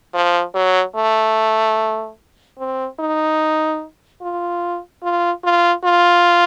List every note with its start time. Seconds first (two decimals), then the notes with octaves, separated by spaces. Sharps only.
0.14 F3
0.54 F#3
0.96 A3
2.59 C4
2.99 D#4
4.22 F4
5.03 F4
5.44 F4
5.84 F4